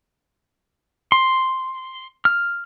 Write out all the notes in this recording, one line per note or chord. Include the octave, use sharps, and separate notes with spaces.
C6
F6